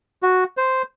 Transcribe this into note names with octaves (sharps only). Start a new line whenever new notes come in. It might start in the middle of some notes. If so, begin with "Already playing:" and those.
F#4
C5